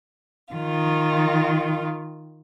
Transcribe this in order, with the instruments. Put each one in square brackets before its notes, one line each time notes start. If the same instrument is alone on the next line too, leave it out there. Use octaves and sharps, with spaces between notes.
[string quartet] D#3 F4